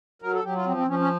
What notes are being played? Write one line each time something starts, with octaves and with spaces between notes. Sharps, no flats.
F#3 A#4
A4
F#3 G4
F4
F3 C4
C4
F3 C#4
C#4